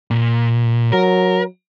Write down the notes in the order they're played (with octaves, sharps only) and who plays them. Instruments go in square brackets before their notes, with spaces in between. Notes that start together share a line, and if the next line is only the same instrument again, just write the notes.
[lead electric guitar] A#2
[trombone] F#3 [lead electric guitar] A#4